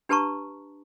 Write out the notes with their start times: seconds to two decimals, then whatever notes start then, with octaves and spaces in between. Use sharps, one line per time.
0.09 D4 G4 B4 A5 A#5 C#6